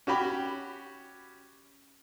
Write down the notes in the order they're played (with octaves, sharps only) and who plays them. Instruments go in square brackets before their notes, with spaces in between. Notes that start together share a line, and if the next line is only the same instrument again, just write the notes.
[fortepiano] C#4 F#4 G4 B5